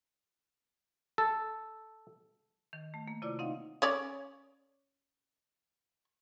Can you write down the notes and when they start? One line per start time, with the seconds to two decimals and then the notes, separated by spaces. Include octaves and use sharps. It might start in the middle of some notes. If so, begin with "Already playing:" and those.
1.18 A4
2.73 D#3
2.94 A3
3.08 A#3
3.22 C3 E4 F4 C#5 D5 D6
3.39 C4 D#4 D#5 F5 F#5
3.82 C#4 C#5 D5